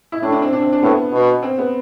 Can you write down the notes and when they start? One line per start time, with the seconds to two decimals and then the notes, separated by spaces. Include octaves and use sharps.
0.12 E4
0.22 A2 D4
0.32 D4
0.42 C4
0.53 D4
0.62 C4
0.73 D4
0.82 A2 B3
1.13 B2
1.43 C4
1.58 B3